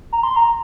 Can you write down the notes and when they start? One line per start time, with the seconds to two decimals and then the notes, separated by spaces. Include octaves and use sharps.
0.13 A#5
0.23 C6
0.36 A#5